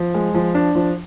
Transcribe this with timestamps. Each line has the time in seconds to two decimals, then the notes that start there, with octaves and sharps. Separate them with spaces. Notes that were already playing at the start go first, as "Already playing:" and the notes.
Already playing: F3
0.14 G#3
0.34 F3
0.55 D4
0.75 F3